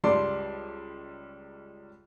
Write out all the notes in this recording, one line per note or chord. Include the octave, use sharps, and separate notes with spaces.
C#2 G3 D5 A5 C6 D6